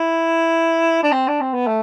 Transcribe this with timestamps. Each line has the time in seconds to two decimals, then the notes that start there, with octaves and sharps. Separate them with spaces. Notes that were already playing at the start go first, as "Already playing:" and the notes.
Already playing: E4
1.03 D4
1.12 C4
1.28 D4
1.41 C4
1.53 B3
1.67 A3